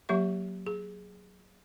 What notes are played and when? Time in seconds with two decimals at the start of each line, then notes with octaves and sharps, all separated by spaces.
0.09 F#3 A#3 G4 E5 C#6
0.67 G#4